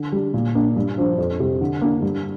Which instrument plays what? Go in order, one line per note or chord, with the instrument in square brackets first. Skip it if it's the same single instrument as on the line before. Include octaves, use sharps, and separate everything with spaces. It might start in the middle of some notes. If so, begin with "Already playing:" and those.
Already playing: [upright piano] D3
G3 D4
A#2
A#3 D4
G2
F3 D4
F2
C3 G3
D3
A#3 D4
G2